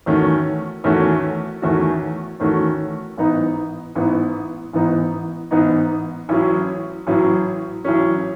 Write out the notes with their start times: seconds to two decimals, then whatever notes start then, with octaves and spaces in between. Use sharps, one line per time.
0.06 E2 D#3 A3 C#4 F#4
0.84 E2 D#3 A3 C#4 F#4
1.62 E2 D#3 A3 C#4 F#4
2.40 E2 D#3 A3 C#4 F#4
3.18 A1 G#2 E3 B3 D#4
3.96 A1 G#2 E3 B3 D#4
4.73 A1 G#2 E3 B3 D#4
5.51 A1 G#2 E3 B3 D#4
6.29 A1 A2 F#3 C#4
7.07 A1 A2 F#3 C#4
7.84 A1 A2 F#3 C#4